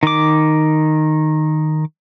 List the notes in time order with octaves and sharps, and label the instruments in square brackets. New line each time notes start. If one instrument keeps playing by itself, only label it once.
[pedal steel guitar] D#3 D6